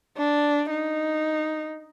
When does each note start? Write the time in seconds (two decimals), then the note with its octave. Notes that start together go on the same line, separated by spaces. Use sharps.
0.17 D4
0.70 D#4